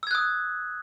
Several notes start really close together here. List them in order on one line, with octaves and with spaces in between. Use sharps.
E6 G#6 F#6 D#6